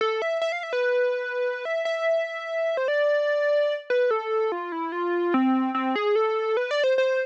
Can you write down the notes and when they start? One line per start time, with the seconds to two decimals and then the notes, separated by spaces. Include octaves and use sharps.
0.01 A4
0.22 E5
0.42 E5
0.52 F5
0.63 E5
0.73 B4
1.65 E5
1.85 E5
2.77 C5
2.88 D5
3.90 B4
4.11 A4
4.52 F4
4.72 E4
4.92 F4
5.34 C4
5.75 C4
5.96 G#4
6.16 A4
6.57 B4
6.71 D5
6.84 C5
6.98 C5